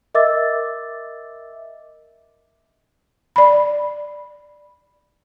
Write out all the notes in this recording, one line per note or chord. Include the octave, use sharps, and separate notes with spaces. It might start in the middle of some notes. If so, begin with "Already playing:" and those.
A#4 D#5 E5 D6 E6 A6
D5 B5